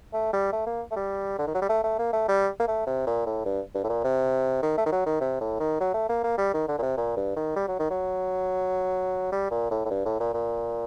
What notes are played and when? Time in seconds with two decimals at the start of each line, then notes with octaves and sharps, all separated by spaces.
0.13 A3
0.33 G3
0.53 A3
0.67 A#3
0.91 A3
0.96 G3
1.39 D3
1.47 D#3
1.54 F#3
1.62 G3
1.69 A3
1.84 A3
1.99 A#3
2.13 A3
2.28 G3
2.60 A#3
2.68 A3
2.87 C3
3.07 A#2
3.26 A2
3.45 G2
3.75 G2
3.84 A2
3.89 A#2
4.04 C3
4.62 D#3
4.77 A3
4.86 D#3
4.92 F#3
5.06 D#3
5.21 C3
5.41 A2
5.60 D#3
5.80 F#3
5.94 A3
6.09 A#3
6.24 A#3
6.38 G3
6.54 D#3
6.68 D3
6.78 A#2
6.82 C3
6.97 A#2
7.17 G2
7.37 D#3
7.56 G3
7.68 F#3
7.79 D#3
7.90 F#3
9.32 G3
9.51 A#2
9.71 A2
9.85 A2
9.91 G2
10.06 A2
10.20 A#2
10.34 A#2